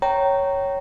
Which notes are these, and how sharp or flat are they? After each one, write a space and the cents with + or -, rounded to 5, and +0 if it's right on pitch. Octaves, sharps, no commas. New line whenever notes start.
C#5 +0 G5 -25 A#5 -10